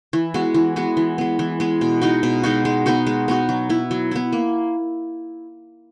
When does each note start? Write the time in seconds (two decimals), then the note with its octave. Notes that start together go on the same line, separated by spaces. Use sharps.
0.13 E3
0.34 G#3 B3 F#4
0.54 E3
0.76 G#3 B3 F#4
0.97 E3
1.18 G#3 B3
1.39 E3
1.60 G#3 B3
1.81 B2
2.02 G#3 D#4 F#4
2.23 B2
2.44 G#3 D#4 F#4
2.65 G#3
2.86 B3 D#4 F#4
3.07 G#3
3.28 B3 D#4 F#4
3.49 F#3
3.69 B3 E4
3.91 F#3
4.11 B3 E4
4.32 A#3